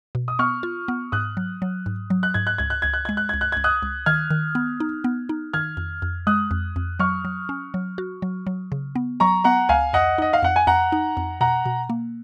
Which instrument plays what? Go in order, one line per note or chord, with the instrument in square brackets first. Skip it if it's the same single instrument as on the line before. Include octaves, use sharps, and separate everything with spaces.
[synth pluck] B2
[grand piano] D#6
[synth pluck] B3 [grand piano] C#6 F6
[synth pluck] F4
B3
[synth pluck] G#2 [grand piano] D#6 F#6
[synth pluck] F#3
F#3
G#2
F#3
[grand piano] F#6
[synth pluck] G#2 [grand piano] G#6
[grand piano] F#6
[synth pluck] C#2 [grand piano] G#6
[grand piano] F#6
[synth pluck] C#2 [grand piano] G#6
[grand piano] F#6
[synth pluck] G#3 [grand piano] G#6
[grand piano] F#6
[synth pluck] C#2 [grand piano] G#6
[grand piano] F#6
[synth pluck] C#2 [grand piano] G#6
[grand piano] D#6 F#6
[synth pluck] C#2
[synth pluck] D#3 [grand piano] F6 G#6
[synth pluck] D#3
B3
D#4
B3
D#4
[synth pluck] D#3 [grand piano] F6 G#6
[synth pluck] F2
F2
[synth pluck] G#3 [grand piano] D#6 F#6
[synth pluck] F2
F2
[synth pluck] F#3 [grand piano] C#6 F6
[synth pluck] F#3
C#4
F#3
F#4
F#3
F#3
C#3
B3
[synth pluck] F#3 [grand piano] A#5 C#6
[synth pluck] B3 [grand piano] F#5 A#5
[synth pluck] C#2 [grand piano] F5 G#5
[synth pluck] F2 [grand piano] D#5 F#5
[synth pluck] D#4 [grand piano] D#5
[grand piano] F5
[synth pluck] F2 [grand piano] F#5
[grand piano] G#5
[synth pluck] F2 [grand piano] F#5 A#5
[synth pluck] D#4
F2
[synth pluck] B2 [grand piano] F#5 A#5
[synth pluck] B2
A#3